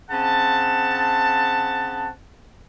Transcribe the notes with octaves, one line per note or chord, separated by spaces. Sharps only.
C#3 C4 F#5 A5